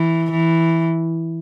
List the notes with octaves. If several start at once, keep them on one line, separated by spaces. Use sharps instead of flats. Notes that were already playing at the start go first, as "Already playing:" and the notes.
Already playing: E3
E3